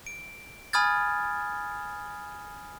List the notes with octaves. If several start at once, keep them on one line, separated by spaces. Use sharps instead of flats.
D7
G#5 B5 D#6 F6 G#6 A6